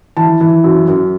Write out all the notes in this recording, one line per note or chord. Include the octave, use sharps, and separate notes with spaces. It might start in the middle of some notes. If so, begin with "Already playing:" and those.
E3 A5
E3
F#2
F#2